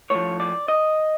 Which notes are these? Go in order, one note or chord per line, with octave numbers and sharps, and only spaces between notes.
A2 F3 C#5
D5
D#5